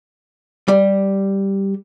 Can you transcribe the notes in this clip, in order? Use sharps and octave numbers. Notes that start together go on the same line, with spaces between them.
G3